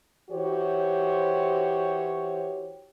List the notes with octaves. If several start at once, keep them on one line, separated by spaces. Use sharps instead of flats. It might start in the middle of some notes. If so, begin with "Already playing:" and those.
E3 F#4 G4 C5 C#5